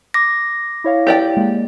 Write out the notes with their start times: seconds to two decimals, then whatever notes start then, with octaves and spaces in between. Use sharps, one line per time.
0.14 D6 A#6
0.84 E4 C#5 F5
1.07 G4 D5 G5
1.37 G#3 A#3